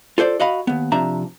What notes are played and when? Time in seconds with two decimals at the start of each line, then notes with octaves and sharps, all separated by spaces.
0.18 F4 A4 C5 D5
0.40 F#4 D#5 F5 B5
0.67 D#2 B3
0.92 C3 F3 D4 E5 A#5